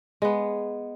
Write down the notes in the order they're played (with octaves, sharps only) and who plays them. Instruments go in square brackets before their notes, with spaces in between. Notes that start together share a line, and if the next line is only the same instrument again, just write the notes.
[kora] G#3 B3